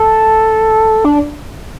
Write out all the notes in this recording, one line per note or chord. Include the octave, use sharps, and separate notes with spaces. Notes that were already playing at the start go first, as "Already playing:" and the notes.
Already playing: A4
D4